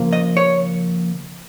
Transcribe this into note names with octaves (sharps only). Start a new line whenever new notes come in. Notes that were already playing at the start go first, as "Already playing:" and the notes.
Already playing: C#3 F3 A#3
D#5
C#5